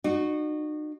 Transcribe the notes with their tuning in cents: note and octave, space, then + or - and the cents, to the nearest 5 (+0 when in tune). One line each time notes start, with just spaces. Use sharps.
D#4 -45 F#4 -10